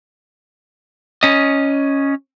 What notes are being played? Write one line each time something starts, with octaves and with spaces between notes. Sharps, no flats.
C#4 D#5